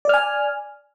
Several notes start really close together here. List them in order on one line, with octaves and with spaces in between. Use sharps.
D5 F6 G#5